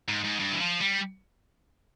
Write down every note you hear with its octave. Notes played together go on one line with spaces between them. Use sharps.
G#2
G#2
G2
E3
F3
G3